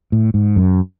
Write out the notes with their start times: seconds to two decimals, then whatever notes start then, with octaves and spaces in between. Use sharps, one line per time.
0.12 A2
0.34 G#2
0.56 F#2